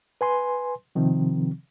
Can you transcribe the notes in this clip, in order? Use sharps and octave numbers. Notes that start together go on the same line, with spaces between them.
B4 G#5 C6
C3 D#3 F3 C4